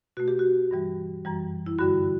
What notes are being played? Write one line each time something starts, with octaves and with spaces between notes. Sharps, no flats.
B2 A3 F#4
G4
F#4
G2 E3 G3
F#2 E3 G3
E4
G2 D3 G3 F#4